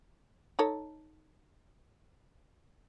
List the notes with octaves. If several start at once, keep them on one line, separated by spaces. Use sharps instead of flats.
D#4 A4 C#5